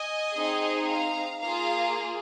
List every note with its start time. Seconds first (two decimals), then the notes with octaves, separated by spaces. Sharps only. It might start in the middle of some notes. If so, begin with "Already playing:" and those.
Already playing: D#5 G#5
0.35 C4 D#4 G#4
0.88 F5 A#5
1.41 A#3 F4 G#4 F5 A#5